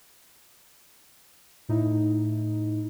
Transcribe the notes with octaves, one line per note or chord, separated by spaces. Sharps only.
A2 D#4 E4